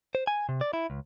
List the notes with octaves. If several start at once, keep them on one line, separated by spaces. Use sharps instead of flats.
C5
G#5
C3
D5
E4
C#2